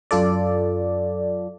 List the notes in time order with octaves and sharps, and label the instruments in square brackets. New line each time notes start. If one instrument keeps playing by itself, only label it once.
[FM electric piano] F#2 F4 A4 D5